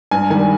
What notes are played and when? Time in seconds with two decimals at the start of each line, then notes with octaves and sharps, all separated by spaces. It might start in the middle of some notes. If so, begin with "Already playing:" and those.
0.11 G2 G#5
0.30 D#3 G3 G#5